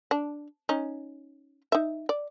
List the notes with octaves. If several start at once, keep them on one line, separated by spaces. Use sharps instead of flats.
D4
C#4 D#4
D#4 E5
D5